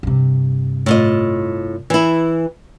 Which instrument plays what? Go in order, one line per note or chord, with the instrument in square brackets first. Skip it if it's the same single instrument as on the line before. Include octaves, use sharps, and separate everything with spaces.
[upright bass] G2 C3
[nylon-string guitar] A2 F4 D#5
E3 E4